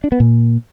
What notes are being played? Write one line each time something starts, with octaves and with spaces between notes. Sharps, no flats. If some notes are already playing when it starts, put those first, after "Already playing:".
D4
B3
A#2